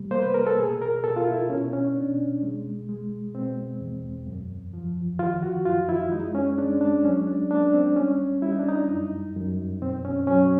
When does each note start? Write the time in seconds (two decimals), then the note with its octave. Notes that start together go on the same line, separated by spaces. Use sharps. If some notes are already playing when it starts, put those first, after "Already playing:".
Already playing: C3 G3 A3
0.11 A#3 C5
0.22 B4
0.34 A#4
0.47 A4
0.58 B2 G#4
0.82 A#4
1.03 B2 A4
1.17 F4
1.27 E4
1.50 B2 C#4
1.73 C#4
1.96 B2 D4
2.43 G#3
2.89 G#3
3.35 B2 C4
3.81 E2
4.27 F#2
4.73 F3
5.19 D#3 F4
5.43 F#4
5.65 F#2 F4
5.89 E4
6.12 G#3 D#4
6.35 C#4
6.58 G#3 D4
6.81 D4
7.04 F#3 C#4
7.27 D4
7.50 A#3 D4
7.73 C4
7.96 G3 C#4
8.42 G3 E4
8.52 D#4
8.59 D4
8.68 D#4
8.90 F#2
9.36 F#2
9.82 B2 C4
10.05 C#4
10.27 F#3 C#4